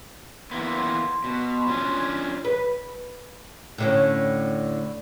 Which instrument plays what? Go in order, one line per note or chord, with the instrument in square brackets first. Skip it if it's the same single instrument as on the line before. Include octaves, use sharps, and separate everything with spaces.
[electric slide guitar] E3 A#3 B3 [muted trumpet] C6
[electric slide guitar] B2
F3 C#4 D4
[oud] B4
A2 D3 C#4